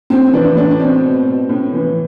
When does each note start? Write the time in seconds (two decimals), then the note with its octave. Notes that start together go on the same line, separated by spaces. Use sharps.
0.10 A2 C4
0.33 E3 D4
0.56 A2 D4
0.71 D4
0.79 B2 C4
1.03 B2
1.26 B2
1.49 A2
1.74 E3